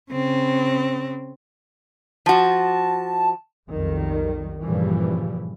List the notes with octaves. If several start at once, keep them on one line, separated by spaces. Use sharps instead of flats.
C#3 C4
F3 F#4 A5
B1 F2 D#3 G3
G2 A#2 C#3 E3 F3 G3